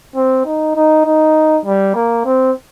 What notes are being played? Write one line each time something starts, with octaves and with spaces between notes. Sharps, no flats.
C4
D#4
D#4
D#4
G3
A#3
C4